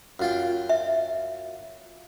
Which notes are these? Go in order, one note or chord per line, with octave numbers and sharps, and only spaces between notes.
F#2 F4 G5
E5